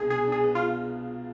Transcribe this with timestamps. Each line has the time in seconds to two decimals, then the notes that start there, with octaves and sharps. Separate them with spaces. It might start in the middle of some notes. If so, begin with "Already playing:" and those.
Already playing: C2 B2 B3 D4 G#4
0.10 B2 G#4
0.27 D4
0.32 G#4
0.43 B3
0.55 F4